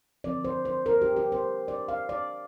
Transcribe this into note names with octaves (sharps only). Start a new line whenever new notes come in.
D3 F3 C4 D5
C5
C5
A#4
G4
G4
C5
D5
F5
D5